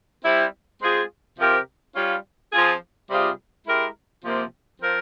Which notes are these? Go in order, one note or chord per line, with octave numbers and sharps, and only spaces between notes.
G3 C4 E4
G#3 C4 F4 G#4
C3 F3 C4 G4 A#4
G3 C#4 F4
F3 C4 F4 G#4
C3 G3 C4 F4 G#4
G#3 E4 G4 A#4
C3 F3 A#3
F3 C4 F4 A#4